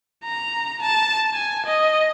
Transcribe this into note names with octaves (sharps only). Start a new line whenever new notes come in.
A#5
A5
G#5
D#5